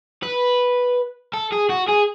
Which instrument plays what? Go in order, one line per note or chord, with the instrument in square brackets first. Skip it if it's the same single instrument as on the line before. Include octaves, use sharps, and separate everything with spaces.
[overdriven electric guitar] B4
A4
G#4
F#4
G#4